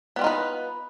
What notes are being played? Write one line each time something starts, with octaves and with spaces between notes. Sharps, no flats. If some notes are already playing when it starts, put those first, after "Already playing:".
G3 B3 D#4 F4 B4